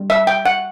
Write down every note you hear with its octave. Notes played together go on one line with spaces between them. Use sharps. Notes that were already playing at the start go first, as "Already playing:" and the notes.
Already playing: G3
E5
G5
F#5